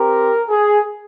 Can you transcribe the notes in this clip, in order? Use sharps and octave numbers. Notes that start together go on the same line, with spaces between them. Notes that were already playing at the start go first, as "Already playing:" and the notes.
Already playing: C4 G4 A#4
G#4